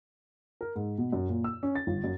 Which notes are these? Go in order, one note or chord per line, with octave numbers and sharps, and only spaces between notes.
A#4
G#2
B2
F#2
A#2
E6
C#4
A6
G1
F#2